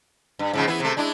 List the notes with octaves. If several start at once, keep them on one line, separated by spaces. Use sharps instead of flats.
G2
G#2 C#3 F3
E3 B3 E4
C3 A3
G#3 D4 E4